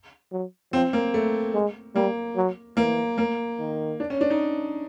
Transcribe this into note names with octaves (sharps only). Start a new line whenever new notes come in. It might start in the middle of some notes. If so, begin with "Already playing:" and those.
F#3
F3 C4
A#3
A3
G#3
G3 A#3
F#3
E3 A#3
A#3
D#3
D4
C#4
D4
D#4